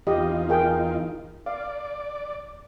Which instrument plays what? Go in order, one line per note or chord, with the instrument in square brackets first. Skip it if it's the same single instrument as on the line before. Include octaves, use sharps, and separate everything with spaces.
[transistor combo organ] E2 D#4 F4 [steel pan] G4 D#5
[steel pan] G#4 A#4 G5
[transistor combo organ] D5 [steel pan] F5